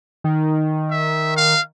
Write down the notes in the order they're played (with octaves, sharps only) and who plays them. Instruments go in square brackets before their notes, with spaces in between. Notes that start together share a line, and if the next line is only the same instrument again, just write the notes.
[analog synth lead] D#3
[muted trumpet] E5
F5